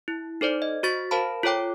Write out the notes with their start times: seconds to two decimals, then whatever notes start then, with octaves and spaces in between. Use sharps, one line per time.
0.08 E4
0.41 D#4 A4 C5 D5
0.62 D#5
0.83 F#4 C5 C#6 A6 B6
1.11 A#4 C5 F5 A5 B5
1.43 F4 A4 C#5 G5 D6